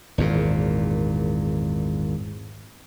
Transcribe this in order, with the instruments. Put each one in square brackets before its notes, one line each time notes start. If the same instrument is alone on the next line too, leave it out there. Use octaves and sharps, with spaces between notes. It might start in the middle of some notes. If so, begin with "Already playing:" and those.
[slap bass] G#1 E2 A#2